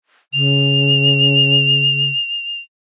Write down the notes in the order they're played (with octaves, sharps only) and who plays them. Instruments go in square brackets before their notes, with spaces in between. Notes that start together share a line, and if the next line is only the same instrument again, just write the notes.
[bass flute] C#3 [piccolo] F7